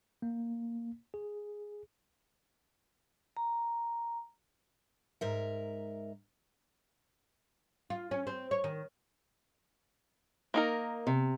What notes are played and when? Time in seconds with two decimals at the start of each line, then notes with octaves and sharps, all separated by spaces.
0.22 A#3
1.14 G#4
3.37 A#5
5.21 G#2 A#4 E5
7.90 F4
8.11 C#4
8.27 C4
8.51 C#5
8.64 D#3
10.54 A#3 D#4 A#4
11.07 C3